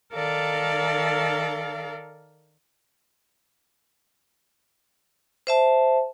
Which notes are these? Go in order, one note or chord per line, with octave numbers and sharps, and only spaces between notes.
D#3 A4 A#4 D5 F5
C5 E5 A5